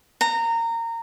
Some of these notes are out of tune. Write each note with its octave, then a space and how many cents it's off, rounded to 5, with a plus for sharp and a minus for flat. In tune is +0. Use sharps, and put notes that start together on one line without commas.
A#5 -20